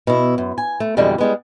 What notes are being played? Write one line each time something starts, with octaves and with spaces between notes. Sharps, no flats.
B2 E4
F#2
G#5
A3
F2 B2 D3 E3 G3 G#3
G3 G#3 B3